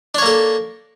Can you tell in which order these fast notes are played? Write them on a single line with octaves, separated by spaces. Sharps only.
D4 C#5 A#3 A4